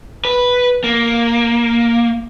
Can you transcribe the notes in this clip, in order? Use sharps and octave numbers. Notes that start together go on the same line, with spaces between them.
B4
A#3